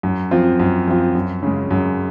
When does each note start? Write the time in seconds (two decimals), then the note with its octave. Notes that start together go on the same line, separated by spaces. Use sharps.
0.03 F#2
0.31 F3 C4 F4
0.60 F#2
0.87 F3 C4 F4
1.15 F#2
1.43 C#3 G#3
1.71 F#2